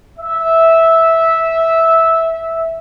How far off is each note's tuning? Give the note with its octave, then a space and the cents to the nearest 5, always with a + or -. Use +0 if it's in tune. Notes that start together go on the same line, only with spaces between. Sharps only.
E5 -10